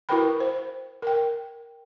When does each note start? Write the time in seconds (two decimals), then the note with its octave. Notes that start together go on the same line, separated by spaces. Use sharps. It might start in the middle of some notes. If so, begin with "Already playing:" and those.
0.09 E4 F#4 A#4 B4 G5 B5
0.40 C5
1.02 A#4 G5